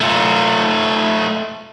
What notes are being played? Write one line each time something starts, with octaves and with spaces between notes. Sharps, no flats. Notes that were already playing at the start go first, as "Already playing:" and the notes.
A3 F4